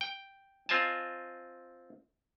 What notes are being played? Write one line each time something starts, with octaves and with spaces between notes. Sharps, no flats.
G5
C4 F4 D#5 G#5 A5